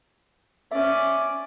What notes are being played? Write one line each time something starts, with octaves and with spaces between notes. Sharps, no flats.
C#4 D5 E5